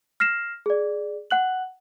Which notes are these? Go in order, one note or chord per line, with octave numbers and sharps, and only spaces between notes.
F6 A#6 C7 E7
G#4 D5
F#5 F#6 F#7